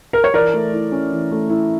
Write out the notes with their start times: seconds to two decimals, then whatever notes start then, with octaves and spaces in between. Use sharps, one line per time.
0.13 A#4
0.24 C#5
0.34 E3 A#4 D5
0.54 A3
0.73 E4
0.92 C#4
1.11 E3
1.31 A3
1.49 E4